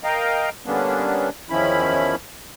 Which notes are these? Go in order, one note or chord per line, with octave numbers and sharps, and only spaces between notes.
A#4 D#5 F5 G5 A#5
D3 G3 A#3 B3 C#4 D4
E2 D#3 F3 C#4 E4 B5